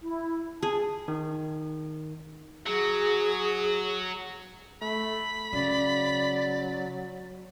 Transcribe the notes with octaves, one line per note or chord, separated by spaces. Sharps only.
E4
G#4 A5
D#3
F#3 G#4
A3 B5
C#3 F#3 D5